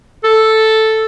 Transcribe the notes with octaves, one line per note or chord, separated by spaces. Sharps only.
A4